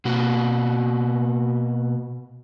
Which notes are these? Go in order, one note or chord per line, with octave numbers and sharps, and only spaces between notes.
B2 A#3 F#4